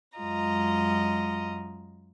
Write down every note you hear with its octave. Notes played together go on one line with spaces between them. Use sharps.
F#2 G#3 F4 D#5 A#5